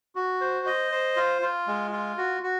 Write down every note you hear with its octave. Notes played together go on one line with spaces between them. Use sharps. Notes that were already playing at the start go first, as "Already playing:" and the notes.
F#4
C5
D#5
C5
F4
F4
G#3
F4
F#4
F#4